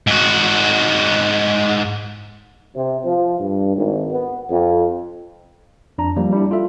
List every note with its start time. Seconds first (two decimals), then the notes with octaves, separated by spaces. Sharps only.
0.07 G#2 F#4
2.75 C3
3.05 F3
3.39 G2
3.76 G#1
4.12 B3
4.49 F2
5.98 F2 D4 A#5
6.17 F3 G3 A#3
6.32 G3 D4 E4
6.51 F4 A4 E5